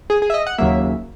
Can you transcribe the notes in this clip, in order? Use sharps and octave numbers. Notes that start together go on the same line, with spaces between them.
G#4
G#4
E5
D#5
F#5
D#2 C#3 F#3 A#3 E5